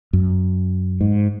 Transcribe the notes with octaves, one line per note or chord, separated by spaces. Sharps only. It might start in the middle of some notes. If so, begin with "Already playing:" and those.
F#2
G#2